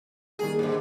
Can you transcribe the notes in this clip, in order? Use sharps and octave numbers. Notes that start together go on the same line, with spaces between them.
D#3 G3 A#3 G#4
G#2 D3